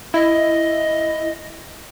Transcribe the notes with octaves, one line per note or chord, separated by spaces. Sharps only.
E4 D#5